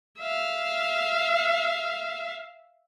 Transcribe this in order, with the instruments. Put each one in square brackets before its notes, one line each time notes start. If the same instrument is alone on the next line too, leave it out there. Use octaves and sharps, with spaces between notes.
[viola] E5 F5